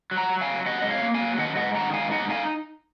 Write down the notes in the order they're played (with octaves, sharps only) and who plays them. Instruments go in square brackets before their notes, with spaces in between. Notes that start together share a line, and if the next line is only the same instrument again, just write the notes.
[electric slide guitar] F#3
F#5 A#5
F#3
F5 G#5
F#3
F#3 D#5 F#5
G#2 D#5
C#5 F5
A#3
F5 G#5
F#3
D#3 D#5 F#5
G#2 D#5 F#5
D#3 F#5 A#5
G#2 F5 G#5
D#4 D#5 F#5
D#4 F5 G#5